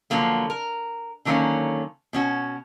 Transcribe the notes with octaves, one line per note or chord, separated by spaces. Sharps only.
D3 F3 F#3 A#3 B3
A#4
D3 D#3 F#3 A#3 C#4
B2 C#4 F#4